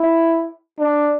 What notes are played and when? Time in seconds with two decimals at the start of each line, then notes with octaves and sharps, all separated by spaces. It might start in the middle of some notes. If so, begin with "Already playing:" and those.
Already playing: E4
0.79 D4